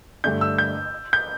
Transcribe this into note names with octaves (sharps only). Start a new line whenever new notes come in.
G2 D3 A3 D4 G6
E6
G6
G6